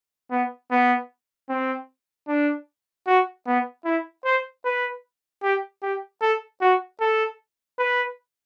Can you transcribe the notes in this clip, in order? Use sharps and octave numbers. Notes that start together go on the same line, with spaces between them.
B3
B3
C4
D4
F#4
B3
E4
C5
B4
G4
G4
A4
F#4
A4
B4